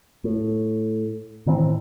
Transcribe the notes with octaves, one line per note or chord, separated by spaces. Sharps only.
A2
A2 D#3 E3 C4